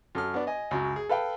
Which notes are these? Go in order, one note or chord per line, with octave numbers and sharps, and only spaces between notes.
F#2 A4 F6
B3 D4
D#5 G#5
C#2 F#2 F#3
G#4
A4 B4 F5 G5